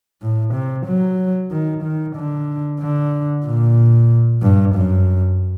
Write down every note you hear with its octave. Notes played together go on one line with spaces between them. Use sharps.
A2
C3
F#3
D#3
D#3
D3
D3
A#2
G2
F#2